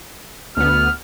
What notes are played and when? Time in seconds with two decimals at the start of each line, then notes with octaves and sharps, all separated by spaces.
0.57 D2 B3 F6